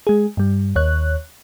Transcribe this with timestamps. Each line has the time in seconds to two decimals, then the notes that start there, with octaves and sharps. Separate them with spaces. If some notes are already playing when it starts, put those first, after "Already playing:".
0.07 G#3 G#4
0.37 G2 G3
0.76 D#2 C#5 F#6